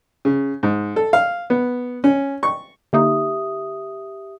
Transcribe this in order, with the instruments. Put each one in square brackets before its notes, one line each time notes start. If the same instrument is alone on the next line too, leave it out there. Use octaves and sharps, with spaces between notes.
[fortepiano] C#3
G#2
A4
F5
B3
C#4
C#6
[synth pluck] D3 A#3 D#4 [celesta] G4 E5 D#6